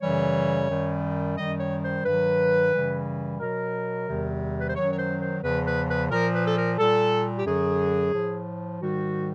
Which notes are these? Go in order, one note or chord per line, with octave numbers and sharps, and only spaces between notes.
F#2 C#3 E3 G3 C#5
F#2 D#3 G3
F#2 D#3 G3 D#5
C#5
C5
G2 D#3 F#3 B4
F#2 C#3 E3 G3
B2 F#3 A#4
E2 C3 D#3 G3
B4
C5
F#2 D#3 F#3 C#5
C#5
C5
C5
E2 C#3 F3 B4
B4
B4
A#2 F3 A#4
B4
A4
A#4
A#2 G3 A4
G4
F#2 D3 F#3 G#4
A2 F3
G#2 D#3 G3 F#4